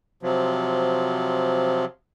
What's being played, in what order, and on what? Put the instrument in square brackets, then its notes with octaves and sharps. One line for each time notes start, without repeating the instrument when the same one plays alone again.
[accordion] C3 F3 F#3